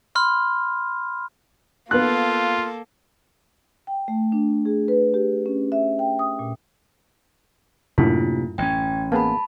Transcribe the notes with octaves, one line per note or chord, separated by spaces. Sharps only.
B5 C6 F6
A#3 B3 F4 A4 F#6
G5
A3
D4
G#4
B4
G4
C#4
E5
G5
D#6
A#2
F#2 A2 C3 A#3 D4 E4 F4
A1 C#4 G5 G#6
A#3 B3 G#4 A5 B5